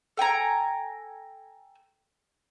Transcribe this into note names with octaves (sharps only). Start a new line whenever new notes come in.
A4 G5 G#5 A#5